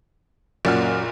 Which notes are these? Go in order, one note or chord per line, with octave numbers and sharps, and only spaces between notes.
F#1 F#2 A#2 D5 F#5 F6